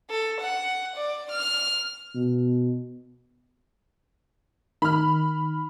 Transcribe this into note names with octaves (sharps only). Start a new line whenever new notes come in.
A4
F#5
D5
F6
B2
D#3 B5 F6